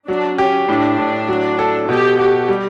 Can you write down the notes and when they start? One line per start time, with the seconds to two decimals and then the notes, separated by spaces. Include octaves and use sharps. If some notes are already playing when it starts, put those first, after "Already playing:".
0.08 F#3 D4
0.38 C#4 G4
0.68 A2 D4
0.98 A2
1.28 F#3
1.59 A4
1.88 B2 G4
2.19 F#4 G4
2.48 G3